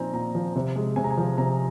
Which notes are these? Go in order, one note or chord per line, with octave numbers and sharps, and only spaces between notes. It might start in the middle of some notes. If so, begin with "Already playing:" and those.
Already playing: A#2 F3 C4 D#4 G#5 A#5
A#2 A#5
F3
C3
G#3
C3 G#5
A#5
G#5
F3
C3 A#5